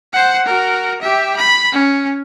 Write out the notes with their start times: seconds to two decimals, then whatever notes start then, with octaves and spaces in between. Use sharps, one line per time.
0.13 C5 F#5
0.45 F#4 A#4
1.02 G4 E5
1.36 B5
1.72 C#4